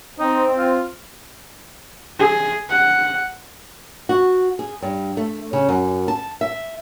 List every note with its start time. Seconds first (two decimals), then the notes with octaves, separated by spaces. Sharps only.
0.19 C4 D#4
0.58 F4
2.19 G#4
2.69 F#5
4.09 F#4
4.59 G#4
4.82 G2
5.17 A3
5.53 C#3
5.69 F#2
6.08 A5
6.41 E5